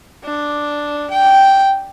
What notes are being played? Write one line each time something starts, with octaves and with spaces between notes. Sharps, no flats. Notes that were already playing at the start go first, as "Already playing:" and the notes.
D4
G5